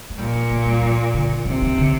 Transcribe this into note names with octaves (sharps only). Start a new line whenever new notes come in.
A3
A#2 G3
A#3
A3
G3
F3
D3
C3 D#3
D#3
D3